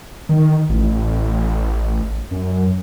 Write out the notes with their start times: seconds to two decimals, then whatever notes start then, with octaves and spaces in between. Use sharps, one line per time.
0.29 D#3
0.69 A1
2.31 F#2